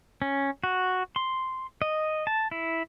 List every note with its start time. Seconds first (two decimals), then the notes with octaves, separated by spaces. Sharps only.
0.22 C#4
0.64 F#4
1.16 C6
1.82 D#5
2.27 A5
2.51 E4